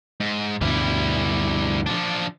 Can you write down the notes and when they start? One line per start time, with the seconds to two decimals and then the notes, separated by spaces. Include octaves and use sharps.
0.20 G#2
0.61 D2 G2 B2 G3 E4
1.86 F3 D4